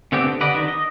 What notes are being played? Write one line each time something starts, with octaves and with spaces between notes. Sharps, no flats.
D3 A3 B3 C4 G4
D3
G4 B4 D5 D#5 F#5
D#3 D4
D#5